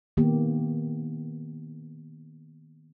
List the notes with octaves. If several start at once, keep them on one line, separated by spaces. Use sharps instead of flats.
D#3 A#3 B3 G4